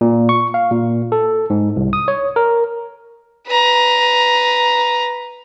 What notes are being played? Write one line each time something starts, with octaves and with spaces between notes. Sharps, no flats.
A#2
C#6
F5
A#2
A4
G#2
C2
D#6
C#5
A#4
B4 A#5